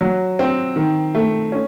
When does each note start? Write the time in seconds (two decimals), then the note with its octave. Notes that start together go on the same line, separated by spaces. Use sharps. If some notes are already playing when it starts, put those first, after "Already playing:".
0.01 F#3
0.39 C4
0.76 D#3
1.15 A3
1.52 C#4